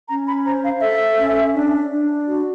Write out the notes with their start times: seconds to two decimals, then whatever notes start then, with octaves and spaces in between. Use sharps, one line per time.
0.09 C#4 A#5
0.27 B5
0.45 C5 A#5
0.63 F5
0.81 A4 E5
1.18 C#4
1.54 D4
1.91 D4
2.26 F#4